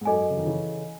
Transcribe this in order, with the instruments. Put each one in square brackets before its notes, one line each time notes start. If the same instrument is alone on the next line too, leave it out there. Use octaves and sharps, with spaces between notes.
[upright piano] G#2
[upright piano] F#2 [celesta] A4 D#5 G#5
[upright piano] C#3
D#3
C#3 E3